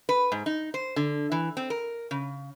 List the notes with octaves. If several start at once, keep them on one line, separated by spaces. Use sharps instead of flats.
B4
G#2
D#4
C5
D3
E3
C4
A#4
C#3